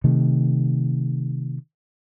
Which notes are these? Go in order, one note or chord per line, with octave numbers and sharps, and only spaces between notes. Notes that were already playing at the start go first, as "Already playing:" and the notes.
C3 D#3 A3